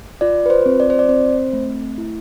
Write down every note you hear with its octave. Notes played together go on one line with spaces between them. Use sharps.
F4 D5
B4
C5
C4
D5
C5
D5
C4 C5
A3
E4